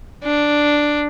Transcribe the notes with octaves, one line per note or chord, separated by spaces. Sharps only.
D4